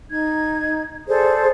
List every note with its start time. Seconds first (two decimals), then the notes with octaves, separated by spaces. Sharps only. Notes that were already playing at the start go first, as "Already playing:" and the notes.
0.11 D#4 G#6
1.08 G#4 A4 C5 D5